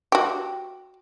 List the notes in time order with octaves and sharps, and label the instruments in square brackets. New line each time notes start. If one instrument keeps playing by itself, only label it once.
[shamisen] F#4 G4